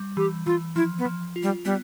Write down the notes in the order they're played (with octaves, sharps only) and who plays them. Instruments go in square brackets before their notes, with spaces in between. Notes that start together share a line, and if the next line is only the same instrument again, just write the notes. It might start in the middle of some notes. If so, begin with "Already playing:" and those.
Already playing: [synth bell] G3
[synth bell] E3 [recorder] G4
[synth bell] E3 [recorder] F4
[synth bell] F3 [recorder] E4
[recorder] B3
[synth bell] F3
F4
[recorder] G3
[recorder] G3 [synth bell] B3